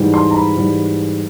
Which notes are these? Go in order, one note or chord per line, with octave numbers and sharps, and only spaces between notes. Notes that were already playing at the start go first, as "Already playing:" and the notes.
Already playing: G#2 E3 G3
C6
A#5
B5
G#2 E3 G3